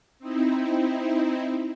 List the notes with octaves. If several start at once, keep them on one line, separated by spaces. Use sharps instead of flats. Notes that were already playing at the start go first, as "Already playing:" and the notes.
C4 D#4 E4